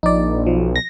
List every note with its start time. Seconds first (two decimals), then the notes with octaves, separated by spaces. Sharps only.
0.03 A#1 D#4 D5
0.46 B1 F3
0.76 A#6